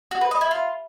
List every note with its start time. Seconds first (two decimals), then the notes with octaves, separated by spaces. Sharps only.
0.11 F#4
0.21 B4
0.31 D#5
0.41 E4
0.51 F4